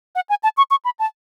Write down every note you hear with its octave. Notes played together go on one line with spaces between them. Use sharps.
F#5
G#5
A5
C#6
C#6
B5
A5